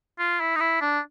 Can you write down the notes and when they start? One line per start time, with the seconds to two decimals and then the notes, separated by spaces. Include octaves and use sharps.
0.19 F4
0.41 E4
0.55 D#4
0.60 E4
0.81 D4